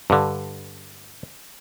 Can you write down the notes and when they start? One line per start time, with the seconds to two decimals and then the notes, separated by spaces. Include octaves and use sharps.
0.10 G2 D3